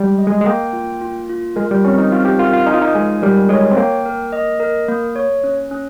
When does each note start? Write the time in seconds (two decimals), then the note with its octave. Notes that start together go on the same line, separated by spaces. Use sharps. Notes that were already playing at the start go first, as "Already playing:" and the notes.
Already playing: G3 G#3
0.18 D#5
0.27 G#3
0.41 G#3
0.46 A#3 G5
0.73 F4
1.01 F4
1.29 F4
1.56 G#3 A#4
1.71 G3
1.84 C4 C#4
1.98 D#4
2.11 C4 F4
2.25 G4
2.39 F4 A#4
2.53 F4
2.67 D#4 G#5
2.74 F4
2.82 D#4
2.95 G#3 G#5
3.22 G3 A#4
3.49 G#3 C#5
3.71 C4
3.77 A#3 G5
4.06 A#4
4.33 D#5
4.60 A#4
4.88 A#3
5.16 C#5
5.44 C#4
5.71 C#4